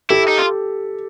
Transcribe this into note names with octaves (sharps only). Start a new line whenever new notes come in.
E4 G4 A4
D#4
F4